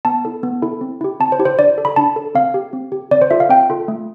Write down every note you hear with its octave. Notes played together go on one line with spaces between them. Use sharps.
B3 A5
E4 A4
B3
E4 A4
C4
E4 G4
C4 A5
C5
E4 G4
C5
D4 D5
A4
B5
D4 A5
A4
C4 F5
G4
C4
G4
C4 D5
C5
F4 A4 E5
F5
C4 G5
F4 A4
A3